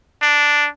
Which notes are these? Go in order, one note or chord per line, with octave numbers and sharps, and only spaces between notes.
D4